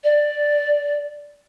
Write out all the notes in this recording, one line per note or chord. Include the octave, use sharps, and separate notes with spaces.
D5